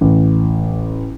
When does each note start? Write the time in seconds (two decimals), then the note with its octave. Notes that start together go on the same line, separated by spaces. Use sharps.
0.01 A1